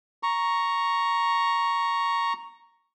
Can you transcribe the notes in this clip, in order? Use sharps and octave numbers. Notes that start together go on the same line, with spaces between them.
A#5 C#6